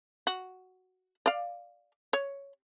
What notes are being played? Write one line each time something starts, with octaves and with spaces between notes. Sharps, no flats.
F#4
D5 F5
C#5